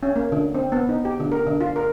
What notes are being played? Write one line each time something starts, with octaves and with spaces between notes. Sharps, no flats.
C#4
A#3
D3
C4
B3
D#4
G4
D3
A#4
D3
F4
A#4